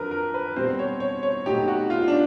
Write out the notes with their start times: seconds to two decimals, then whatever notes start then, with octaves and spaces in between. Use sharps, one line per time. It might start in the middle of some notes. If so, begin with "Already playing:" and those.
Already playing: F2 D3 F#3 A#4 B4
0.11 A#4
0.34 B4
0.56 B2 G3 C4 C5
0.79 C#5
1.00 C#5
1.23 C#5
1.46 B2 F#3 A3 C4 D#4 G4
1.68 F#4
1.90 F4
2.08 D4